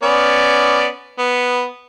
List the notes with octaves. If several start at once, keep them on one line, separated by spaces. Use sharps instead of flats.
B3 C#4 D5
B3